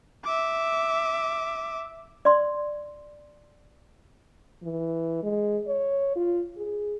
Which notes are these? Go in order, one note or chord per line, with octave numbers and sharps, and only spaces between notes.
E5 D6
D5 C6
E3
G#3
C#5
F4
G#4